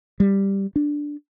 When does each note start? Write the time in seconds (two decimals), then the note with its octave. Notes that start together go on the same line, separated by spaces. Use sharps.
0.20 G3
0.76 D4